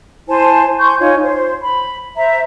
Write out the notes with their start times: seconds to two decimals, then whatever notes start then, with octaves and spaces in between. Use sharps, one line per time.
0.28 E4 C5 G#5 A5
0.78 G#5 C6 C#6 G6
0.99 D#4 F4 C#5 G#5
1.22 C5
1.62 B5
2.16 C5 E5 A#5